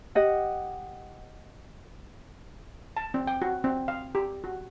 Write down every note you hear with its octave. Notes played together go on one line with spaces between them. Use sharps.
G4 D#5 F#5
A5
C4
G5
F#4
C4
F5
G4
F#4